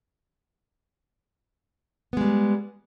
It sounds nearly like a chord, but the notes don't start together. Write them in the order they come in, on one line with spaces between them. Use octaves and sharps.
B3 G#3 G3